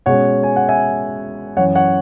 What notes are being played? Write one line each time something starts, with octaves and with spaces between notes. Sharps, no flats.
B2 G#3 C#4 C#5 F#5
G#5
F#5
E5 G#5
F#2 E3 C#4 C#5 F#5
C#5 F#5